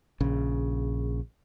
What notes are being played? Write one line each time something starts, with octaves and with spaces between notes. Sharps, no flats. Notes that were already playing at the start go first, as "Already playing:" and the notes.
A#1 C#3